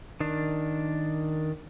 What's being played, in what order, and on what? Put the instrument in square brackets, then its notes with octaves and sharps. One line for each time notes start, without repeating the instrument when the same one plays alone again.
[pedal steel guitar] D#3 D4